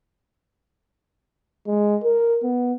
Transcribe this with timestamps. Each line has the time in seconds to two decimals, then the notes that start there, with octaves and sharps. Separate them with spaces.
1.67 G#3
2.03 A#4
2.43 B3